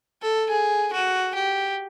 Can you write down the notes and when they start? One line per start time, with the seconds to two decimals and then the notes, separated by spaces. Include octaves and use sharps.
0.22 A4
0.50 G#4
0.93 F#4
1.35 G4